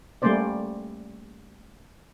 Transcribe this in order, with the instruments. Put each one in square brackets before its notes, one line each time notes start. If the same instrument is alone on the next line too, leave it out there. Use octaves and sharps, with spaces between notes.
[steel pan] G3 A3 A#3 C#4 C5 D5